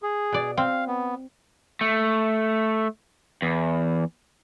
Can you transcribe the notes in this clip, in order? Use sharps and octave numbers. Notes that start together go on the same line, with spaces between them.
G#4
B2 D5
C4 F5
B3
A3
E2